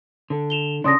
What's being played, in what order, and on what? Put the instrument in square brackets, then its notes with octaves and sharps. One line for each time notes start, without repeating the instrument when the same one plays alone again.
[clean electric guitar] D3
[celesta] E7 F7 G7
[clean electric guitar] C#3 D4 [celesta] C6 D#6 A#6